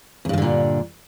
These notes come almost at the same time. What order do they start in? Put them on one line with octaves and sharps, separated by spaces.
E2 G2 D#3 D3 A#2